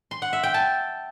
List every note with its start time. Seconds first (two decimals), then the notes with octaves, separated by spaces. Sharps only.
0.11 C6
0.22 F#5
0.33 E5
0.43 G5
0.54 A5